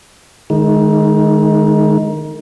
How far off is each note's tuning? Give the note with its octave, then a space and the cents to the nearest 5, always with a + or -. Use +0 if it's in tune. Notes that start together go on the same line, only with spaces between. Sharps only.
D#3 -20 G#3 +15 D#4 +25